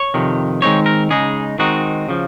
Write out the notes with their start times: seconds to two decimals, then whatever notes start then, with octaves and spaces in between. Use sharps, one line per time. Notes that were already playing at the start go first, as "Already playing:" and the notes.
Already playing: C#5
0.14 F2 C3 D#3
0.62 D#3 G#3 C4 D#4 C#5
0.86 A#4
1.10 C#3 G#3 D#4 G#4
1.59 D#3 G#3 C4 D#4 F#4
2.09 C#3 F3